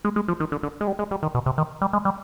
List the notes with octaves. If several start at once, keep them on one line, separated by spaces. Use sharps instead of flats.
G#3
G#3
F3
D#3
D3
D3
G#3
G3
G#3
G3
D#3
B2
C3
D#3
G3
G#3
G3